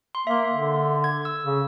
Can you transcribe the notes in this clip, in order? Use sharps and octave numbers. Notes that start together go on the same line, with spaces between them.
C6
A#3 E5 C6
D3
G#6
E6
C#3